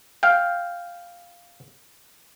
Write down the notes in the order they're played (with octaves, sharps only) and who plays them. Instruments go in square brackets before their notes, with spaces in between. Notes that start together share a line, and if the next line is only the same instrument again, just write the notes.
[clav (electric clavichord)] F5 G5